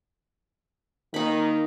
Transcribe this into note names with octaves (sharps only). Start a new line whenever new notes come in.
D#3 A#3 D#4 B5